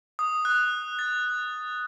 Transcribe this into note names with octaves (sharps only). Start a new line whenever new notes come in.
D#6
F#6
A6